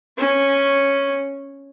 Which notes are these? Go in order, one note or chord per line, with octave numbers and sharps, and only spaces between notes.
C#4